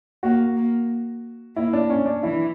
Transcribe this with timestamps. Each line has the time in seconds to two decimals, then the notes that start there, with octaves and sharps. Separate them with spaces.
0.23 A#3 F#4
0.57 A#3
1.56 A#3 E4
1.73 D4
1.90 C#4
2.06 D4
2.23 E3 E4